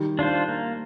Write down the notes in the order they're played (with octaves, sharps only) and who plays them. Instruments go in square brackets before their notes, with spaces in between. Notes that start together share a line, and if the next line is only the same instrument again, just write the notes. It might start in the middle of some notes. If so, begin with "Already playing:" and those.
Already playing: [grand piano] D#3 G3
[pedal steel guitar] D4 F4 C5
A#3